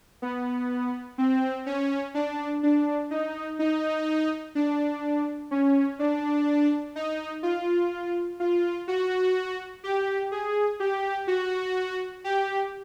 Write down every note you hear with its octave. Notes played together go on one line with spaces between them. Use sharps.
B3
C4
C#4
D4
D4
D#4
D#4
D4
C#4
D4
D#4
F4
F4
F#4
G4
G#4
G4
F#4
G4